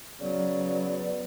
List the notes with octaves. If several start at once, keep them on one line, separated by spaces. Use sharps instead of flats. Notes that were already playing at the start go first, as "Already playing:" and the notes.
C#3 F#3 B3 D5